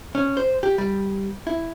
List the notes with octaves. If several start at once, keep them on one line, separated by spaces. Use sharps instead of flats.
C#4
C5
G4
G3
E4